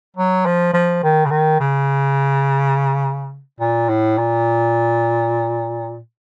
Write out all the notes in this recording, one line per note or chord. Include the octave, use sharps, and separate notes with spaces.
F#3
F3
F3
D#3
C#3
D#3
C#3
A#2
A2
A#2